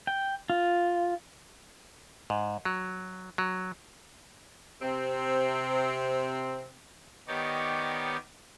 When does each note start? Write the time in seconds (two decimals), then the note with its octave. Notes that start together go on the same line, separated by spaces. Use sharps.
0.07 G5
0.50 F4
2.30 G#2
2.65 F#3
3.38 F#3
4.82 C3 C4
7.28 D#3 B3 D#4 G4 C#5 D5